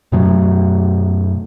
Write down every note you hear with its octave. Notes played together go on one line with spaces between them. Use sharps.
F#2 B2 F#3 A3